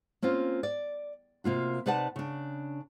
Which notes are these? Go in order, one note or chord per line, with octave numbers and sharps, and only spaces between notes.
A#3 C4 C#4 F4
D5
C3 A#3 F4 F#4
C3 D#4 B4 D5 F#5 A5
C#3 D4